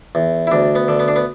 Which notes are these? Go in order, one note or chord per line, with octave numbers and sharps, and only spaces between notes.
E2
E4
D2 D4
B3
D3
B3
D4
B3